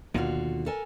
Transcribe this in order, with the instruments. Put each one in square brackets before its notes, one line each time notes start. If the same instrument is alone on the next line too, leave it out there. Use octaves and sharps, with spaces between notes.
[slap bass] D#2 B2 D#3 [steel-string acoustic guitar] D3 F4 F#4
[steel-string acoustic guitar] A4 A#4 G#5